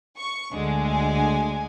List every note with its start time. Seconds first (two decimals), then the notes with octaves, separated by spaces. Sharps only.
0.16 C#6
0.52 D2 D3 G#3
0.87 G#5